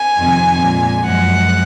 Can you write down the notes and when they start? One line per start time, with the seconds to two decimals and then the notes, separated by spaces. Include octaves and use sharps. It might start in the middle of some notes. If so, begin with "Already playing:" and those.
Already playing: G#5
0.16 F2 C3 D#3
0.61 A#2 G#3
1.06 F#2 F3 G#3 F#5